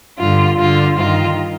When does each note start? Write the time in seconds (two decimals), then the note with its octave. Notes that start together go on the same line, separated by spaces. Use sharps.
0.19 G2 D3 F4
0.58 G2 D3 F4
0.97 G2 D#3 F4